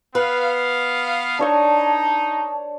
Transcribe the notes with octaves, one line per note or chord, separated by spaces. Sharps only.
B3 B4 F5
D4 D#4 C#5 A5 C#6